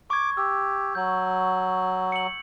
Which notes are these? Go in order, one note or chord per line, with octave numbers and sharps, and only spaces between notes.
C#6 D6 G#6
G4 E6
F#3 G6
C#7 F#7